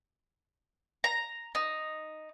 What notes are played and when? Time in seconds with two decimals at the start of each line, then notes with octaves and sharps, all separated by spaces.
1.04 A#5
1.55 D#4